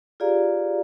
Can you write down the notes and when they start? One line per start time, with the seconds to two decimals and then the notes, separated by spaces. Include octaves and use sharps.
0.20 F4 G4 G#4 D5 F5 A#5